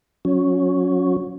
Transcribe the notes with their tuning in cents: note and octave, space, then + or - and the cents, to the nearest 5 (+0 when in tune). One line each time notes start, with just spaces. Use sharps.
F#3 -30 C#4 +0